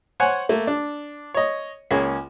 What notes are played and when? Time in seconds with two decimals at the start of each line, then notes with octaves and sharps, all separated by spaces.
0.20 C5 C#5 F#5 G#5
0.49 A3 A#3
0.67 D4
1.34 C#5 D#5
1.91 C#2 A#3 C#4 G#4